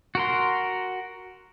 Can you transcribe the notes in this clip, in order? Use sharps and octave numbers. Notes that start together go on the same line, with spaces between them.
F#4 A#4 C6